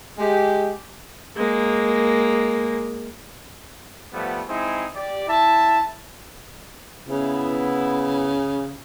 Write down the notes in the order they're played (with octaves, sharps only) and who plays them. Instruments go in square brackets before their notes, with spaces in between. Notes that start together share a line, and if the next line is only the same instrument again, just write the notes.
[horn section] G#3 G4
[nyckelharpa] G#3 A#3
[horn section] F3 G3 A3 B3
G#3 C4 D#4 E4 G#4
G4 D5
E4 E5 A5
[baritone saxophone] C#3 [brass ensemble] B3 E4